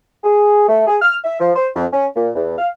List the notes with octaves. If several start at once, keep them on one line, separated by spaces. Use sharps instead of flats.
G#4
A3
G#4
F6
E5
F3
C5
F2
C#4
A#2
E2
F5